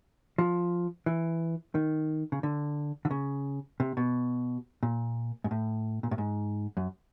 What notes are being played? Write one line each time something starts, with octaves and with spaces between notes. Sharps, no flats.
F3
E3
D#3
C#3
D3
D3
C#3
C3
B2
A#2
G#2
A2
A#2
A2
G#2
F#2